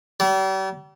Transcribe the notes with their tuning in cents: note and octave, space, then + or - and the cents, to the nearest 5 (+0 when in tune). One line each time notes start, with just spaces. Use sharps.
G3 -40